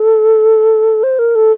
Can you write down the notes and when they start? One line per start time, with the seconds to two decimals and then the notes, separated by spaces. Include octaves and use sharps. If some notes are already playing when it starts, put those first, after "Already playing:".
Already playing: A4
1.03 C5
1.19 A#4
1.35 A4